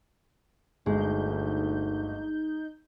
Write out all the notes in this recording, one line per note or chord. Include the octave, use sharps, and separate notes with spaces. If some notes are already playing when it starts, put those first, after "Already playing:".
G1 D2 G#3 D#4 G6